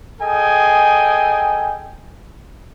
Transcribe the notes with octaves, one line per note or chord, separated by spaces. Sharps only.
G#4 A4 D#5 G5 G#5